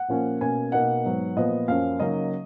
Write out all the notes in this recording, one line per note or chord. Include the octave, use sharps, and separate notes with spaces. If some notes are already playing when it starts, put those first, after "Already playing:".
Already playing: F#5
A#2 F3 A#3 C#4
B2 A#3 C#4 G#5
B2 A#3 D#4 F#5
G#2 F#3 B3
A#2 F3 B3 D#5
F#2 F3 A#3 C#4 F5
C#3 F#3 A#3 D#4 D#5